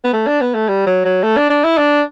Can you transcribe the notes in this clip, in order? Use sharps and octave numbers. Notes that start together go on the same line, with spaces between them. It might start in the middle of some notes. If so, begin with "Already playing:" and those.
B3
A3
D4
B3
A3
G3
F#3
F#3
A3
D4
D4
E4
D4